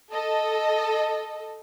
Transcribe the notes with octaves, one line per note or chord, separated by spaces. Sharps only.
A4 D#5